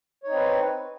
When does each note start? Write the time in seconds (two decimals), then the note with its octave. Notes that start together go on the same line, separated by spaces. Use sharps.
0.23 C#5
0.27 D#4
0.31 C4
0.35 B4